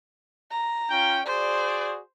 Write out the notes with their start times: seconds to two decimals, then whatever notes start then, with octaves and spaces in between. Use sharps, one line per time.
0.52 A#5
0.90 C#4 F4 G5
1.26 F#4 G#4 C5 D5